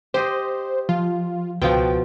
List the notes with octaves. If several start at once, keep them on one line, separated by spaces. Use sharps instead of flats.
G4 C5 D#5
F3 F4
C#2 B2 F3 G5